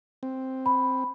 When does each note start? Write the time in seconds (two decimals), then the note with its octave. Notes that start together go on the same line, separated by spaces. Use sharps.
0.23 C4
0.66 B5